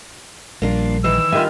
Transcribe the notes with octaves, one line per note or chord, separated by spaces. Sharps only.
A#1 G3 A#3 D4 F4
D#3 E3 E4 E6
G2 D#3 F4 E5 G#5